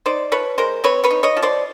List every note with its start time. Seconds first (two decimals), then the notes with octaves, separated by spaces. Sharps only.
0.06 D#4 C5 D5
0.32 F3 B4 C#5
0.58 G#3 A#4 C5
0.84 C4 B4 C#5
1.04 B4 C#5
1.11 D#4
1.23 C#5 D#5
1.37 F3
1.43 C5 D5